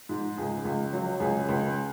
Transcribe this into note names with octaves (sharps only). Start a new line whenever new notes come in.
G#2
C#2 G#4
C#2
F#3
C#2 G#4
C#2